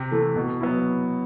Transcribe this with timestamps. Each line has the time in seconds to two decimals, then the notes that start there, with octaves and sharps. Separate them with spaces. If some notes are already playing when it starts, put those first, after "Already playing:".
Already playing: C3
0.11 E3 A3
0.36 B2
0.61 F#3 B3 E4